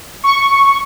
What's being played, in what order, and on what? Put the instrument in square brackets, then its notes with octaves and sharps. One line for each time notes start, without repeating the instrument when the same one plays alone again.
[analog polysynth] C#6